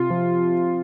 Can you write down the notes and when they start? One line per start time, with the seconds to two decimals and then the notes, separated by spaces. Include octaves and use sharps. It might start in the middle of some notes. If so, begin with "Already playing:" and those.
Already playing: C3 F4
0.10 F3